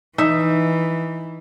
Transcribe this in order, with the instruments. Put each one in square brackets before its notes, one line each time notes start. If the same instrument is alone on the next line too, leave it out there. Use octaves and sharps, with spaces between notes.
[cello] E3 [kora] D#4 E5